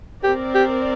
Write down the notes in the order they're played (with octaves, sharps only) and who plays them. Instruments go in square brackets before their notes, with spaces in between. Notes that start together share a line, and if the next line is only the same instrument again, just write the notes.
[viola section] C4 A#4 D5 [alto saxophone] G4
[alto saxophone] G4